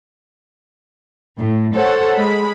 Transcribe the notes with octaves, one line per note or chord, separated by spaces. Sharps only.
A2
A4 C5 C#5 F#5
G#3 B5